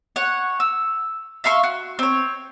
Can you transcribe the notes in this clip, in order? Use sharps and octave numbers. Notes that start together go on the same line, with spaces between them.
C#5 F#5
E6
E5 F5 C6 C#6
F#4
C4 C#5